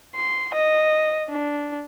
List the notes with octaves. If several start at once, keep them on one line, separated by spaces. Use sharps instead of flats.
C6
D#5
D4